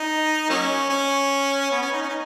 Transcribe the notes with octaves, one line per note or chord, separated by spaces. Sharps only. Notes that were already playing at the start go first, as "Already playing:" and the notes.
Already playing: D#4
F#3 A#3 C#4
C#4
B3
C#4
D#4
C#4
D#4